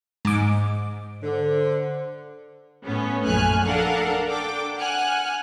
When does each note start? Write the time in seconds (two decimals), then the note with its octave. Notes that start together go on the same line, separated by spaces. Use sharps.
0.25 G#2 D6
1.23 D3 C5
2.85 A2 B3 C#4
3.25 A#1 F#2 A3 G#5 F6 F#6
3.65 D4 A4 A#4 F5 F#5
4.26 D4 A4 G5 D6
4.78 F#5 G#5 F6 F#6